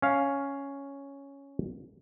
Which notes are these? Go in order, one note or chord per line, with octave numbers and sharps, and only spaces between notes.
C#4 F5